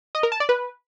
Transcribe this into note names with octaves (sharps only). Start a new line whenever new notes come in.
D#5
A#4
A5
D5
B4